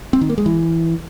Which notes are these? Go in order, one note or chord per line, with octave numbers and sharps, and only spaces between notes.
C4
D#3
A#3
G#3
E3